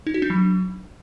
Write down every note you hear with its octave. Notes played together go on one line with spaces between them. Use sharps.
D#4
F#4
D4
F#3